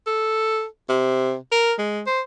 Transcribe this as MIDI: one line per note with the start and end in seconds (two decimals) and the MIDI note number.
0.07 0.65 69
0.89 1.36 48
1.52 1.73 70
1.79 2.02 56
2.06 2.21 72